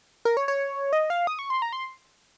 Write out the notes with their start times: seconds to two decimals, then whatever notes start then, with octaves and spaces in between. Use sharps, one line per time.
0.25 A#4
0.37 C#5
0.48 C#5
0.93 D#5
1.10 F5
1.27 D#6
1.39 C#6
1.50 C6
1.62 A#5
1.73 C6